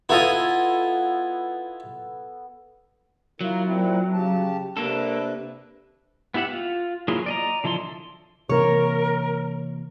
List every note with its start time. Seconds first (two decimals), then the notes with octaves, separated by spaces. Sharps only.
0.09 B3 E4 F4 A4 D#5 G#5
3.41 F#3 E4 F4 A#4
3.65 A#2 C4 E4
4.13 C#3 G4 A5
4.77 C3 A#3 D4 A4 B4
6.34 B3 E4 G4 E5 F#5
6.51 F4
7.08 F#3 A#3 E4 F4 G#4
7.26 D5 D#5 A#5
7.64 D3 F3 E4 A4 C6
8.49 C3 E3 A#3 A#4 C#5